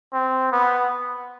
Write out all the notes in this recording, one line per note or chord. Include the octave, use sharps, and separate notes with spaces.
C4
B3